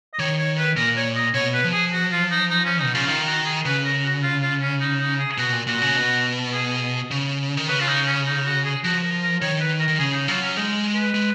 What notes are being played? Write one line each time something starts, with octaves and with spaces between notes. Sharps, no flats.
D#5
D#3 C#5
C#5
B4
A#2 A#4
C#5
D#5
B2 C#5
B4
F3
G#4
F#4
F4
D#4
D#4
C#4
B2 D#4
C#3 F4
D#3 F4
F#4
G#4
C#3 B4
A#4
F#4
F4
F4
C#4
D#4
D#4
G#4
G#4
B2 F#4
A#2
A#2 F#4
C#3
B2
G#4
C#3
D#3
C#3 B4
F4
D#4
C#4
D#4
F#4
G#4
F3 F#4
A#4
A#4
D#3 C#5
B4
A#4
D#3
C#3 G#4
D#4
F#3 F4
C#4
G#3 D#4
B4
G#3